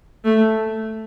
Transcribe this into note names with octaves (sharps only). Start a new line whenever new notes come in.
A3